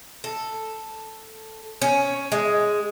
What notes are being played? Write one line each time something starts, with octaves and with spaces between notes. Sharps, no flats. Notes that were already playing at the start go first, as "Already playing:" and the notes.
A4
C#4
G#3